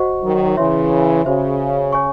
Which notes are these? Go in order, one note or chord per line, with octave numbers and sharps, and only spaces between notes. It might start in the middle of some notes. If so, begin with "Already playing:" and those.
Already playing: F#4 C5 D#5 F#5 C#6
D#3 F#3
C#3 E3 C#5 E5 C6
C#3 F#4 C5 E5
C#5 G#5 C#6